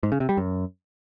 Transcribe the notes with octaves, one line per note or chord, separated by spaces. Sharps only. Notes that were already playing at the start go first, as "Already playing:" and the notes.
G#2
C#3
C3
G3
F#2